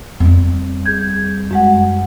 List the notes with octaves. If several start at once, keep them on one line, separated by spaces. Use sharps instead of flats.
F2 G3
G#4 G6 G#6
F#2 G#3 F#5